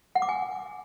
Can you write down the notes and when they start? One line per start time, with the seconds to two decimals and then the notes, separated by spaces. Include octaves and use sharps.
0.15 F#5
0.22 D6
0.29 G#5